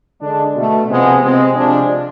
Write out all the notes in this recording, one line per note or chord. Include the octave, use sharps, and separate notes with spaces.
D3 G#3 D4
B2 A3
C3 F3 G#3 B3
C3 G#3 C4
C3 F3 G#3 D4